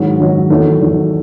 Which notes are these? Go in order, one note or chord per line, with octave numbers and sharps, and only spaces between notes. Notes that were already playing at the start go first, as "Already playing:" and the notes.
Already playing: G#2 D#3 F#3 C#4
G#2 D#3 F#3
E2 D#3 F#3 A3
E2 D#3 F#3